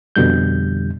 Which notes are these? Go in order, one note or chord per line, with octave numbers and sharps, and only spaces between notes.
F2 B2 D3 G3 G6